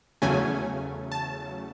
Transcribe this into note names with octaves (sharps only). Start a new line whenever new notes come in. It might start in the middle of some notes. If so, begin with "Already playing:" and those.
E2 C#3 F#3 A3 C#4 G#5
A5